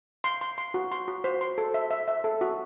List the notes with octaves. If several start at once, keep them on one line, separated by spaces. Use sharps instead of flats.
C6
C6
C6
F#4
C6
F#4
C5
C6
A4
E5
E5
E5
A4
F#4